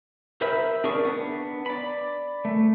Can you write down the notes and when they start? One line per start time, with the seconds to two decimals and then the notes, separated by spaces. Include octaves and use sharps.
0.41 A#4 C5 E5 B5 E6
0.84 D4 G#4 A#4 D5 C#6
1.05 B3 D4
1.66 D5 B5
2.45 A3